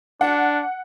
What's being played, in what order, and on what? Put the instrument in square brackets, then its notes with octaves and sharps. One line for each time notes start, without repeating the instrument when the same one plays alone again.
[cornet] D4 [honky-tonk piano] F#5